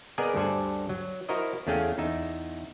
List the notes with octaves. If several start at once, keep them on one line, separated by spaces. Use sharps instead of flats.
B3 G#4 A#4 D5 D#5 G#5
D2 G2 A4 C5 D5 G#5
F#3
E4 F#4 A#4 C5 D#5
E2 A3 C#4 G#4 F5 G5
E2 D#4 E5